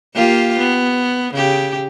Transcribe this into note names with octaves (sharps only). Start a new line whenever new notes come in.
A#3 F4 G4
B3
C#3 G4